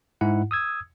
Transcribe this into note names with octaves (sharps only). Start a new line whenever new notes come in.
G#2 E4 F#5
D#6 E6 G#6